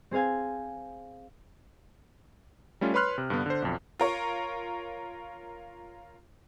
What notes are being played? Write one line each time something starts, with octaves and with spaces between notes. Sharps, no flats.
C4 G#4 C5 F5 G#5
G3 A3 C#4 F4
B4 C#5 B5 C6 F6 F#6
C3
G2 D3 B3
D3 C5
B1 F2
F4 A#4 C#5